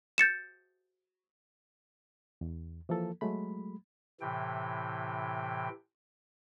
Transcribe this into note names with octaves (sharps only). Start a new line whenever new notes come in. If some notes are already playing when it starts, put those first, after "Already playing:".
G6 A6 C#7 E7
E2
E3 F3 A#3 A4
F#3 G#3 A3 B5
A2 C3 E3 G5